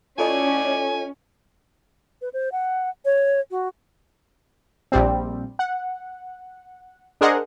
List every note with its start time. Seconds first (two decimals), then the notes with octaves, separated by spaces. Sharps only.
0.18 A2 C#4 F4 A4 D5 D#5 G#5
2.21 B4
2.33 C5
2.52 F#5
3.05 C#5
3.51 F#4
4.92 A#1 G3 C4
5.59 F#5
7.21 D4 G#4 A#4 C5 D#5 F#5